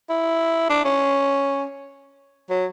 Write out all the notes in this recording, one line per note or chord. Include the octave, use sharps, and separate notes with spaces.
E4
D4
C#4
F#3